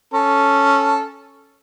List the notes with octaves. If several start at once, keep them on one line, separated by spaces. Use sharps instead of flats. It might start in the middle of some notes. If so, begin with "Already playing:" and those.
C#4 A4